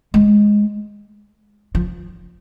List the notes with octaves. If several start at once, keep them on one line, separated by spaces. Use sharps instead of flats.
G#3
F3